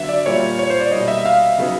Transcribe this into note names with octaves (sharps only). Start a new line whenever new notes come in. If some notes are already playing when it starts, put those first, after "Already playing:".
Already playing: D3 F#3 B3 E5
D5
A#2 G3 A#3 C#5
C#5
C5
D5
B2 G3 A#3 D#4 D#5
E5
F5
C#3 F#3 B3 D#4